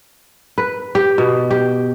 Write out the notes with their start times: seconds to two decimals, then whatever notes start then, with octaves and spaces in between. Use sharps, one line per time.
0.58 B4
0.95 G4
1.18 B2
1.51 G4